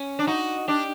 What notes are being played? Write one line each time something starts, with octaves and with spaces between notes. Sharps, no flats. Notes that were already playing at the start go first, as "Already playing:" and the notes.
Already playing: C#4
D4
D#4 F#4
D4 G4